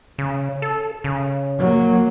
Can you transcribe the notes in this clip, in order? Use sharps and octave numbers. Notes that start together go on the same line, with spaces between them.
C#3
A4
C#3
F#3 A#3